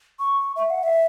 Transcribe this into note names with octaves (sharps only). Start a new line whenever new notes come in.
C#6
E5
F#5
E5